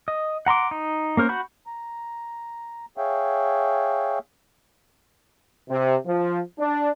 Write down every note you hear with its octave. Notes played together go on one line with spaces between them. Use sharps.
D#5
F#5 A#5 C6 D6
D#4
A#3 C#4 A#4 C5
F#4 F#5 B5 C#6 G6
A#5
G#4 C#5 E5 F5 G5
C3
F3
D4